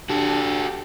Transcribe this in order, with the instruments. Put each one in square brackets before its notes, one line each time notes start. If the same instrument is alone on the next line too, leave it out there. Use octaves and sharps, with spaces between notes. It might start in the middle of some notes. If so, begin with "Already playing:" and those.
[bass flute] D4 [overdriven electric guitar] F#4 A4 [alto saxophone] G4